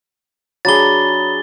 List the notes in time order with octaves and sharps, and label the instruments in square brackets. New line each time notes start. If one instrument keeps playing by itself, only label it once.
[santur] F#3 D4 G#4 [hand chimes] C#5 A#5 B5 [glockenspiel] A6 G7